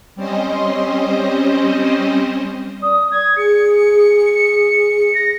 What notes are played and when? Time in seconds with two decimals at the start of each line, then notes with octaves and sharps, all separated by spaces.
0.15 G3 C4 C#4 C5 D#5
2.82 D5 D#6
3.11 G#6
3.37 G#4 C#7
5.15 A#6